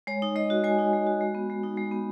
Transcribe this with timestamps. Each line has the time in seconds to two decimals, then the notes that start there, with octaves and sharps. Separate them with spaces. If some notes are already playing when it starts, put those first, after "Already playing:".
0.07 G#3 C#5
0.22 D#4
0.36 G#3 D#5
0.50 F#4
0.64 G#3 G#5
0.79 D#4
0.93 G#3
1.07 F#4
1.21 G#3
1.35 B3
1.50 G#3
1.63 D#4
1.77 G#3
1.91 B3